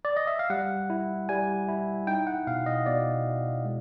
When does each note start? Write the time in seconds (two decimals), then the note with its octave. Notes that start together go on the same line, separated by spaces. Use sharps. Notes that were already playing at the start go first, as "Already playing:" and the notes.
0.05 D5
0.17 D#5
0.27 E5
0.39 F5
0.50 G3 F#5
0.90 E4
1.29 G3 G#5
1.69 E4
2.07 D#4 G5
2.27 F#5
2.47 B2 F5
2.66 D#5
2.86 B2 D5
3.26 B2
3.65 G#3